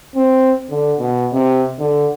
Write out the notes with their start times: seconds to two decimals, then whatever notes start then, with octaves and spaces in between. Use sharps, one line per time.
0.16 C4
0.71 D3
0.99 B2
1.33 C3
1.79 D3